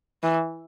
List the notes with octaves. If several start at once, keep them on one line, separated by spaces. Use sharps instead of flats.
E3